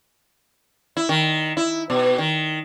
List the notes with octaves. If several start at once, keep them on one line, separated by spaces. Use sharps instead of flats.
E4
D#3
E4
B2
D#3